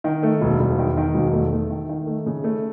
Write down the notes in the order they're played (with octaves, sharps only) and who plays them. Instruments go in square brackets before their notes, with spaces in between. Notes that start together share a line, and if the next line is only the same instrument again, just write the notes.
[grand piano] D#3
A3
E1
E1
D#3
D#3
E1
A3
A3
D#3
D#3
A3
C#3
A3